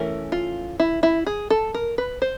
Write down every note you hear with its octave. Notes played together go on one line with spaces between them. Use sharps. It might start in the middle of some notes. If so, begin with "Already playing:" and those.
Already playing: E3 A3 C#4 A#4
F4
E4
E4
G#4
A4
A#4
B4
C5